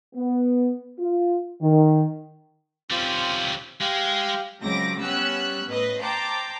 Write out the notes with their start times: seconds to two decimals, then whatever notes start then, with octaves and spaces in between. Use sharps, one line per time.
0.15 B3
0.99 F4
1.62 D#3
2.91 G3 C4 C#4 F4 D6
3.81 G#3 G4 F5
4.63 C#2 F#3 C4 D6 A#6
5.01 G3 B3 C#4 E6 F#6
5.68 A2 B4 D#5
6.01 C5 G5 A5 A#5 D6